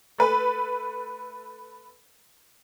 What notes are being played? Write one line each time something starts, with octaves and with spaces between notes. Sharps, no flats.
A3 B4